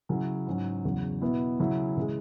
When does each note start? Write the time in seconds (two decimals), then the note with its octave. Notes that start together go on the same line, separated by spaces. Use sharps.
0.09 C#3 F#3 C#4 E4
0.47 G#2 F#3 C#4
0.85 E2 C#3 F#3
1.21 B2 B3 E4
1.59 C#3 F#3 C#4 E4
1.97 C#3 E3 G#3